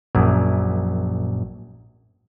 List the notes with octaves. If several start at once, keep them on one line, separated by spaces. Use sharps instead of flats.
A#1 F#2